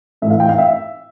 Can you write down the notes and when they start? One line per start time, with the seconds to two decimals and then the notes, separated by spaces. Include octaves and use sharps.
0.22 A2 E3 A3 E5
0.30 F5
0.40 G5
0.49 F5
0.58 E5